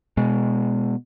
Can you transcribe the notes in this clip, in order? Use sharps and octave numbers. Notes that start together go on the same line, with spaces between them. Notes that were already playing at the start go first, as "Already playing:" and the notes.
B2 G#3